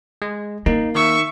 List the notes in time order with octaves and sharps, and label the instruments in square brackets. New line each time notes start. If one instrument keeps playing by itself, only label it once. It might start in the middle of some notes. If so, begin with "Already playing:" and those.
[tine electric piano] G#3
[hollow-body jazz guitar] A#3 [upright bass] C#4 [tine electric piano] D#4
[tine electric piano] D#3 [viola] E5 C#6